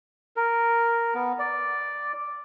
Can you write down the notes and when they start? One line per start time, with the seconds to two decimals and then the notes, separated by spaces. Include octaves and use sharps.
0.36 A#4
1.15 B3
1.39 D5